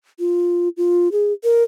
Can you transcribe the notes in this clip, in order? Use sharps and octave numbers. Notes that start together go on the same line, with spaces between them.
F4
F4
G#4
A#4